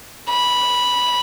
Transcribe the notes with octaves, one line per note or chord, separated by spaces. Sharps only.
B5